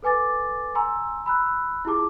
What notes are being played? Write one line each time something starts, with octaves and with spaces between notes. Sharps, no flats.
A4 B4 G#5 D6 A6
G#5 A#5 C6 E6
B5 E6 F#6
E4 F4 G4 G#4 A5 D6